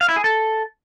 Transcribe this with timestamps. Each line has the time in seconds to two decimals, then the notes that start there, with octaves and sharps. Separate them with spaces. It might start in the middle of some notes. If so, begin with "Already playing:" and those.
0.01 F5
0.09 E4
0.16 G#4
0.24 A4